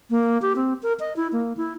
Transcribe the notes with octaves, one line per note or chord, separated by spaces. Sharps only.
A#3
G4
C4
A#4
D#5
E4
A#3
E4